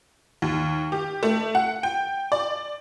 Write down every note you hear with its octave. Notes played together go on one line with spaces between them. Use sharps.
D#2
G4
A3
F#5
G5
D5